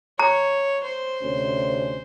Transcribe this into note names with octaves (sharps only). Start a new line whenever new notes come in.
C#5 A#5
C5
D2 C3 C#4